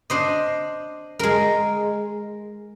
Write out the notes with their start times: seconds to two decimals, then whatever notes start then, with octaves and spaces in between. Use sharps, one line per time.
0.10 D4 C5 D#5
1.19 G#3 A#4